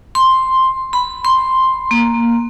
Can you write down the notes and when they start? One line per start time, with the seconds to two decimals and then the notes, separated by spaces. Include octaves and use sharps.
0.15 C6
0.93 B5
1.25 C6
1.91 A#3